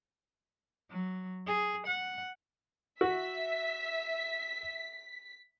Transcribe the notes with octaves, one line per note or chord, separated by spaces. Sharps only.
F#3
G#4
F#5
F#4 E5 B6